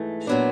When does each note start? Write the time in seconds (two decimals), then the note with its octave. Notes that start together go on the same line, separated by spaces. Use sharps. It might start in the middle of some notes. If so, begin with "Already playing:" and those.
Already playing: G#2 E3 A3
0.27 A#2 F#3 B3 D4